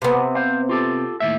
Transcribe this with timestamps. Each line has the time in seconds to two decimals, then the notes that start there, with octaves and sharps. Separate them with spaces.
0.02 C3 B3
0.35 C5 F5
0.69 F4 G4 A4
1.20 D#2 A2 E5